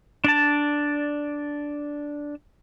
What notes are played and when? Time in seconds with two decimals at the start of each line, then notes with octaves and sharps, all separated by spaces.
0.24 D4 D5 A5